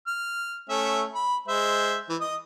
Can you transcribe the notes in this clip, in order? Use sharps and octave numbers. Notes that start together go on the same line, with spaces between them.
F6
A3 C#4 E5
B5
G#3 C5 E5
E3
D#5 D#6